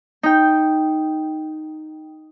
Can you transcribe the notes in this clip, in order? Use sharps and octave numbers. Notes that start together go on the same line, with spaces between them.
D#4 G5